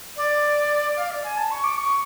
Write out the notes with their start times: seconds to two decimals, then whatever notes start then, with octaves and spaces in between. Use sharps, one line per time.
0.17 D5
0.97 F5
1.11 D5
1.24 G#5
1.37 A5
1.51 C#6
1.64 D6
1.78 C#6